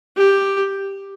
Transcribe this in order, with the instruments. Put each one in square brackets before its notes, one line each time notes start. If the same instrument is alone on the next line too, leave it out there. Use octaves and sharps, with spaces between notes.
[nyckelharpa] G4